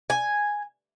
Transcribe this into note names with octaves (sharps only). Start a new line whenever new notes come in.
G#5